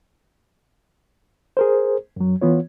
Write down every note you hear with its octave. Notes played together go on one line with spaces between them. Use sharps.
G#4 A#4 C5
F#2 F#3
E3 B3 F4 C#5